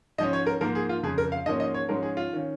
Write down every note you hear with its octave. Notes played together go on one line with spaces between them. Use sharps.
G#2 F3 C#4 D#5
C#5
A#4
G#2 F3 A#3 A#4
G#4
F4
F2 C#3 F3 G#4
A#4
F5
G#2 F3 A#3 C#4 D#5
D#5
C#5
G#2 F3 G#3 C#4 A#4
G#4
F4
D#3 C#4